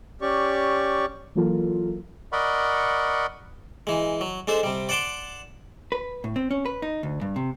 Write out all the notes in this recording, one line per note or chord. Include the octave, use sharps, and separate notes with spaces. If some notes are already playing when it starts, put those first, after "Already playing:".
C#4 G4 D5 C#6
E3 F#3 A#3 F4 A4 A#4
A#4 D5 D#5 F#5 B5 C#6
E3 G#3
F#3
G#3 D4 A4 C5
C3 G3
D5 F#5 A5 C6 D6
B4
A2
C4
C#4
B4
D#4
D2
G2
C3